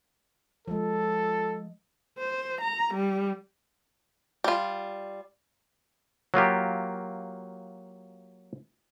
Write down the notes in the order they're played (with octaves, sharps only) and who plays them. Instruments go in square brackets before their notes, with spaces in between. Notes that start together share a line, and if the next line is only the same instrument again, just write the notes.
[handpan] F3 G#3 [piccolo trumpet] A4
[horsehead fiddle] C5
A#5
G3
[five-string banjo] G3 F4
[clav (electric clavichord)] F#3 A#3 F4 G4